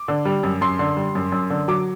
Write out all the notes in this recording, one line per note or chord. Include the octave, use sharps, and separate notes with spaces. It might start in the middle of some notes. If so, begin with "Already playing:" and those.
Already playing: D6
D3
G3
F#2
F#2 C6
D3
G3
F#2
F#2
D3
F#3 D6